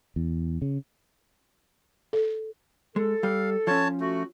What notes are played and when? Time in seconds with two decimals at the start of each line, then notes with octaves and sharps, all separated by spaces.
0.16 E2
0.62 C#3
2.13 A4
2.96 G#3 A4
3.23 G3 F5
3.67 F3 C#4 C#5 A5
4.00 A3 F#4